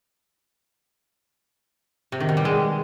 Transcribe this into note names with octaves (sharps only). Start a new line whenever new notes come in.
C3
D#3
B2
G3
G#3